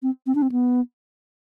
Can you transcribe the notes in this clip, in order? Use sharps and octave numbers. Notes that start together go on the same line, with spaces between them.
C4
C4
D4
C4
B3